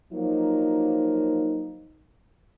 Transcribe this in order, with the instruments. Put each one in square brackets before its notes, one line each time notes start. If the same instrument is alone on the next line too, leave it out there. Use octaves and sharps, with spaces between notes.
[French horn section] F3 F#3 A#3 D#4